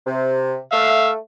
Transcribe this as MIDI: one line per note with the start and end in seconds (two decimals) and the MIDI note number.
0.06 0.57 48
0.72 1.15 57
0.72 1.09 76
0.72 1.09 77